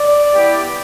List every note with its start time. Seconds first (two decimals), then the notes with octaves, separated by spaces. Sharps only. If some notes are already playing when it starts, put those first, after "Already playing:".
Already playing: D5
0.33 B3 E4 G4